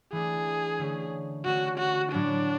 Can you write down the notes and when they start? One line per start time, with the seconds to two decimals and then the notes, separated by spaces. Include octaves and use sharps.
0.12 E3 A3 D4 G#4
0.79 D3 A3 C#4
1.45 D3 A3 C#4 F#4
1.78 F#4
2.12 A2 F#3 C#4 D4 F#4